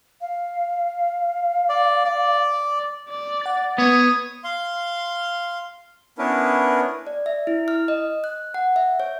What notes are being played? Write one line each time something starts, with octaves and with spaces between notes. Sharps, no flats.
F5
D5
D5
D5
F#5 A6
B3 C#5 D#6
F5 C6
B3 C#4 D4 E4 A#4 B4
D5
E5
E4
F6
D#5
F#6
F#5
E5
C#5